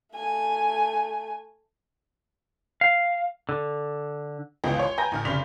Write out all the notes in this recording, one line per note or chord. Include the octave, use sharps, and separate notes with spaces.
A3 G#5
F5
D3
G1 C#2 E3 B3 D#5 G5
C#5 C6
B4 G5 G#5 A#5 G6 A#6
A1 D3 F6
F1 C#3 D5 C6 B6 F7